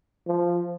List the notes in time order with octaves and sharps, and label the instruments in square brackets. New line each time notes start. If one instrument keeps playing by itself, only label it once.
[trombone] F3